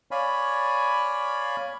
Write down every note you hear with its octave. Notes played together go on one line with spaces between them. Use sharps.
C#5 D5 F5 G#5 B5